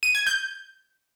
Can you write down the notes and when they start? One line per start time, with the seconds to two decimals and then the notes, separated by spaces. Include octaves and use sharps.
0.03 D#7
0.15 G#6
0.27 G6